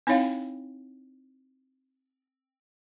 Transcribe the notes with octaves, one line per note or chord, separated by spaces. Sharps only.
C4 D#4 E4 C#5 F5 G5